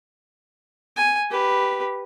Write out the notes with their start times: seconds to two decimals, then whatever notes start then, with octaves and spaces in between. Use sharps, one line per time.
0.97 G#5
1.31 G4 B4